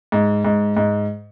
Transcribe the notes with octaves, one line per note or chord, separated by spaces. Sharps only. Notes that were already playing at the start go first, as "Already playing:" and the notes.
G#2
G#2
G#2